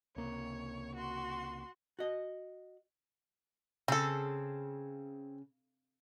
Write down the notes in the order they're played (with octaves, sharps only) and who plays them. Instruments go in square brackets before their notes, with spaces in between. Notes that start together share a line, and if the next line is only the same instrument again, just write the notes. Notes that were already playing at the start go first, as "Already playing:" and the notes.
[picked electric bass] C#2 C3 A#3 [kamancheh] C#5
[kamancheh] F#4 C6
[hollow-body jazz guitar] F#4 D#5
[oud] C#3 [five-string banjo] C4 A4